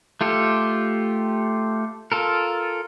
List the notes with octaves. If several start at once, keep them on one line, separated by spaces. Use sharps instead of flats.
A3 F4 G4 A4
F4 A4 A#4